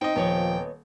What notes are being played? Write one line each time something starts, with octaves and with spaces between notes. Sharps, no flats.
C4 D#4 D#5 G5
D#1 F3 B3 C#5 D#5